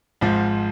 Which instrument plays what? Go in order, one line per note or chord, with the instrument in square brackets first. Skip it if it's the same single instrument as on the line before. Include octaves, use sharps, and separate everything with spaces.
[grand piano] G#1 G#2 F3